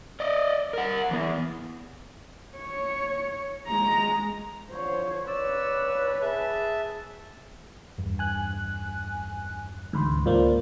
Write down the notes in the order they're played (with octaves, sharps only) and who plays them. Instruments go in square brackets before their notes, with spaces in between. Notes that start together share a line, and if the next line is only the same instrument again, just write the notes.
[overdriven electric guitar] D5 D#5
A#4 F#5
E3 B3
[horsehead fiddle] C#5
G#3 A#5
[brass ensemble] D3 F3 [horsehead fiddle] C5 C#5
[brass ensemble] C#2 C#5 [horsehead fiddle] B4 [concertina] D5 E6
[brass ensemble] G#4 [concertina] E5 A5
[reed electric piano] E2 G2
[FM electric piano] G#5 F#6
[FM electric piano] D2 G#2 [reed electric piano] E3 B5 C6
[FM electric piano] C#2 G#2 A#3 [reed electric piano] F4 C5 D5